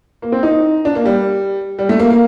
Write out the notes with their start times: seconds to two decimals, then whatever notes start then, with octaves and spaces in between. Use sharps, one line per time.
0.22 A#3
0.32 C4
0.43 D#4
0.85 D4
0.95 A#3
1.05 G3
1.79 G3
1.89 A3
1.99 A#3
2.10 A#3